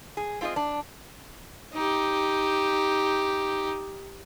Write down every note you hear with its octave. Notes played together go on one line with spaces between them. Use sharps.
G#4
C4 F4 G#4 D5 D#5
D4
D#4 G4